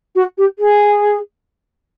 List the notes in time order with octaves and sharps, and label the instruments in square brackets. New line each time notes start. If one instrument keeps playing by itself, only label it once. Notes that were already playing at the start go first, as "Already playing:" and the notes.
[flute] F#4
G4
G#4